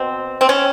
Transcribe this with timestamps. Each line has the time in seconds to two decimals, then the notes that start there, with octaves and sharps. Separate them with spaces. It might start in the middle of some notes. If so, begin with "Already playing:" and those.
Already playing: B2 C4
0.41 C4
0.49 C#4